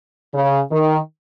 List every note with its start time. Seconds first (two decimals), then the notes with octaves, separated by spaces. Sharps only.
0.33 C#3
0.71 D#3